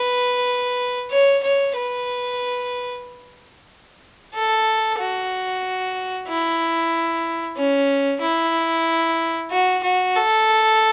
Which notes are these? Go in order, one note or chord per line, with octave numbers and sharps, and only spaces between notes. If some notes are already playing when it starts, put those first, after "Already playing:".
Already playing: B4
C#5
C#5
B4
A4
F#4
E4
C#4
E4
F#4
F#4
A4